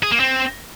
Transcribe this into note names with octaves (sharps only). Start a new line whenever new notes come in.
G#4
A#3
C4